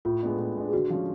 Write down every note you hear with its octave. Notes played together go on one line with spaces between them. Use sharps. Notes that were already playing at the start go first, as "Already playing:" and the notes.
A2 F4
G#3 B3 D4
A2
G#3 B3 D4
G#4
D3 F#4
F3 G#3 C#4